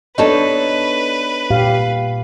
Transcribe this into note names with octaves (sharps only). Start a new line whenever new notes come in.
B3 D4 D#4 A4 B4 C#5 A5
A#2 G4 F5